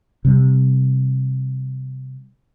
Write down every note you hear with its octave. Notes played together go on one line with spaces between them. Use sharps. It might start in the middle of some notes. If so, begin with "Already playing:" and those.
C3 G3